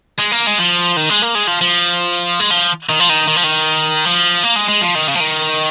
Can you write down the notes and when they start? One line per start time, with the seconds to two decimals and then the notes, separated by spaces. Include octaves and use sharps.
0.19 G#3
0.32 A#3
0.47 G#3
0.59 F3
0.97 D#3
1.09 G#3
1.22 A#3
1.35 G#3
1.47 F3
1.61 F3
2.40 G#3
2.51 F3
2.89 D#3
3.00 F3
3.09 D#3
3.28 D#3
3.36 F3
3.44 D#3
4.05 F3
4.44 A#3
4.56 G#3
4.69 G#3
4.82 F3
4.95 D#3
5.08 C#3
5.15 F3
5.20 D#3